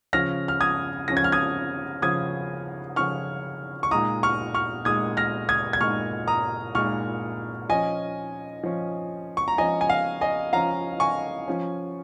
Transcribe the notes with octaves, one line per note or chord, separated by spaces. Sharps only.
C#3 F3 C#4 F6 A#6
F6
D#6 G#6
C#3 F3 C#4 A#6
G#6
F6
D#6 G#6
C#3 F3 C#4 D#6 G#6
C#3 F3 C#4 C#6 F6
C#6
A#2 G#3 D#4 A#5 D#6
C#6 F6
C#6 F6
A#2 G#3 D#4 D#6 G#6
F6 A#6
D#6 G#6
G#6
A#2 G#3 D#4 C#6 F6
A#5 D#6
A#2 G#3 D#4 C#6 F6
F3 C#4 D#5 G#5
F3 C#4
C#6
A#5
F3 C#4 D#5 G#5
G#5
F5
D#5 G#5
F3 C#4 F5 A#5
G#5 C#6
F3 C#4